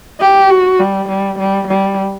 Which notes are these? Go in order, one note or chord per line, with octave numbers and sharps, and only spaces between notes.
G4
F#4
G3
G3
G3
G3